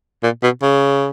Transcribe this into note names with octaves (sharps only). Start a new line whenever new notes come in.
A#2
B2
C#3